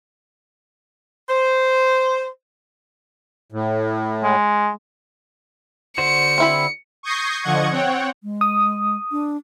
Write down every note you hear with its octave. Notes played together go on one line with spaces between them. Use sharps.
C5
A2
G#3
D3 F#4 C5 C#7
C4 E4 B5
C#6 D#6 G6 G#6 A#6 C7
D3 F3 D#5 F#5 C#6 G#6
C4 C#5 F#5 G5
G#3
D#6
D4